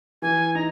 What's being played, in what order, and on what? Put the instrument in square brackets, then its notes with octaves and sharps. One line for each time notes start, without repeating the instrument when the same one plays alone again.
[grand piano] E3 [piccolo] G#5
[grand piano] D#4 [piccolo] A#5